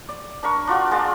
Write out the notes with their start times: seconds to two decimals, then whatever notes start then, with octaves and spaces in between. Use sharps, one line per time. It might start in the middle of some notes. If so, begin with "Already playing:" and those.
0.09 D5
0.43 D4 A#4 C#6
0.67 D4 F4 F#4 D5
0.91 G#3 F4 D5 A5